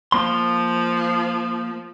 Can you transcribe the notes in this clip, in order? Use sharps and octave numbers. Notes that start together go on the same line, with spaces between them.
F3 A#3 C6